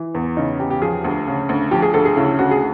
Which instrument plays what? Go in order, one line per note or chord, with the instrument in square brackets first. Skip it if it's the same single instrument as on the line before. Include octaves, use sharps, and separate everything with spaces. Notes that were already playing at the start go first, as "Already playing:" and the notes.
Already playing: [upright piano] E3
E2
C#3 D#4
E2 G4
G4
F3 G#4
D2
C#3
D2
F3 G4
G#4
D2 A4
G#4
C#3 E4
D2 F#4
G#4